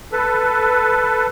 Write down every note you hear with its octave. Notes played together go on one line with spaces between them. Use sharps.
A4 B4